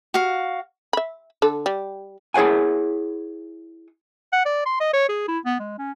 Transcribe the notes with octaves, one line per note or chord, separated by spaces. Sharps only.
F#4 F5
E5 B5
D3 A4
G3
E4 G#4 C#5 F#5 G#5
F#5
D5
C6
D#5
C#5
G#4
E4
B3
G#3
C#4